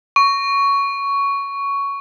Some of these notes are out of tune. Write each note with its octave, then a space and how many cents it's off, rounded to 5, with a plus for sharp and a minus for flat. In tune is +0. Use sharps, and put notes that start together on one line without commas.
C#6 +10